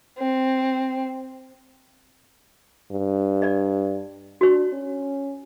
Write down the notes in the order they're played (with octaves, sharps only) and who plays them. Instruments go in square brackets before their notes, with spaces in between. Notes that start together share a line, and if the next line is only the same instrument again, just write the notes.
[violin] C4
[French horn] G2
[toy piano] D5 D#5
[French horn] D4 [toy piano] F#4 C#5
[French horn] C#4